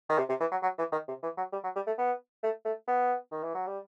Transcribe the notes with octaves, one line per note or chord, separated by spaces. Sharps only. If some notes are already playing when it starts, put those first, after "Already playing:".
D#3
C3
C3
E3
F#3
F#3
E3
D#3
C3
E3
F#3
G3
F#3
G3
A3
B3
A3
A3
B3
D#3
E3
F#3
G3